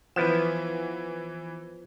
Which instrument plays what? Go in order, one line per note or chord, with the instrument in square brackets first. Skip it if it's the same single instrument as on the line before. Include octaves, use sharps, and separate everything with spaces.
[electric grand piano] E3 B4 E7 [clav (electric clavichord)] F3 B3 E4